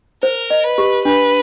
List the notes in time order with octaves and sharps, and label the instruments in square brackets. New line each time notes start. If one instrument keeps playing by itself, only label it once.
[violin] A#4 [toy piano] C5
[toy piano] D#5
[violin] B4
[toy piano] G4
[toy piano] D4 [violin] B4